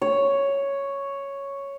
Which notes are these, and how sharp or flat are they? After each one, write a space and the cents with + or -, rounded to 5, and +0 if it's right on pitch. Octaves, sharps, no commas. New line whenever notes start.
C#5 +0